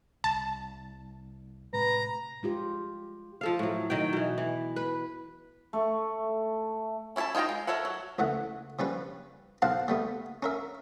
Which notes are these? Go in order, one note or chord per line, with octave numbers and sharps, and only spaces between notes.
C2 A5
A2 C3 G#3 B4 A#5
G#3 F4 G4
F3 A4 F5
A2 F#3
D#3 F#3 G5
B2 E3
E3
B4
A3 C#6
C#4 E4 C#5 E5 A5
D#4 F4 C#5 G5 A#5
G#3
A4 A#4 C#5 E5 F#5
F#3
C#2 E3 A3 F#5
F3 G3 C#4 B4
B1 C5 F5 F#5 A5
G3 A3 B3
C#4 A#4 E5